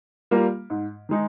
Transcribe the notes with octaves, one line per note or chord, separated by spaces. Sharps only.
G3 A#3 F4 A#4
G#2
D#3 G#3 D#4